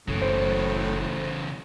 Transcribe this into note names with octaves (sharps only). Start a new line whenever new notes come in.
F#1 A2 C#3 E3
C5